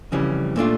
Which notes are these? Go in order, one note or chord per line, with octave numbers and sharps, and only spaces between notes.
F2 C#3 E3 G3 C#4
A#2 A3 D4 F4